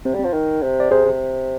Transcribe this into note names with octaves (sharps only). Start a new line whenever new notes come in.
C3 C4
G3
C4
F3
D#3
C3
D5
C3 G#4 C5
C3